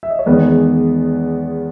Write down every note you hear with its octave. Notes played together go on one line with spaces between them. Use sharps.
E5
D#5
C#5
E2 D#3 G#3 B3 B4